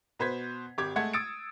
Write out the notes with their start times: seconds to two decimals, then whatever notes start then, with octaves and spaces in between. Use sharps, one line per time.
0.19 B2 B4 C5 G#6 B6
0.78 G#1 G4 D6 G#6
0.96 G#3 A3 F#5 G#6
1.13 D#6 E6 A6 C#7 D7